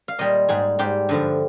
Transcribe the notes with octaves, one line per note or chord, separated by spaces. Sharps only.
F5
A#2 G3 D#5
G#2 G3 G#4
G#2 G3 G4
G2 D3 F3